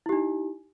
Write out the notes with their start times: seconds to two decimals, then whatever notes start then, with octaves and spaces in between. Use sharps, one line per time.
0.06 E4
0.09 G4
0.12 D#4